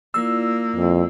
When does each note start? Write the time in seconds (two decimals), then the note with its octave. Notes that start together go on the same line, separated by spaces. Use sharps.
0.14 A#3 E4 F4 D5 E6
0.76 F2